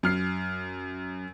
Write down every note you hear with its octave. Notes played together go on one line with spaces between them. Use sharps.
F#2 F6 C7